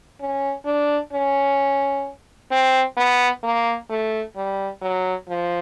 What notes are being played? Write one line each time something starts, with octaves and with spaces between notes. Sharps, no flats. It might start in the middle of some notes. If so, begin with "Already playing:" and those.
C#4
D4
C#4
C4
B3
A#3
A3
G3
F#3
F3